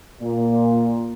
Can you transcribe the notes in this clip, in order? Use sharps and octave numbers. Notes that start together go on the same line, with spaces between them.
A#2